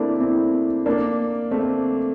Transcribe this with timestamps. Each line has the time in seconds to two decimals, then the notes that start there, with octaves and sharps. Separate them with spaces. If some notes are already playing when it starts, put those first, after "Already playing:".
Already playing: A3 A#3 C4 D4 E4
0.20 C4 E4
0.86 A#3 D4
1.51 A3 C4